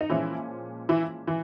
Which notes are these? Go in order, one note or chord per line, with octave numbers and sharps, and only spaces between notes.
D#4
A#2 E3 F3 G#3 C#4 E4
E3 E4
E3